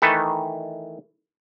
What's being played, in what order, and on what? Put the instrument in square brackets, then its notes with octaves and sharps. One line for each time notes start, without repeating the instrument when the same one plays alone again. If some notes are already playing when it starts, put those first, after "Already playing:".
[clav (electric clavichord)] D#3 E3 A3 A4 B4